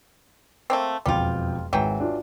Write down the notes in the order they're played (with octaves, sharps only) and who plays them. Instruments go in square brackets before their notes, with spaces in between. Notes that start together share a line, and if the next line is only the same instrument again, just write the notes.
[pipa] A3 A#3 C4
[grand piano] E1 F2 G5 [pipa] G3 F4
[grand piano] G#1 G#2 [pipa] E3 F#3 G5
[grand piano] D4 F4 F#4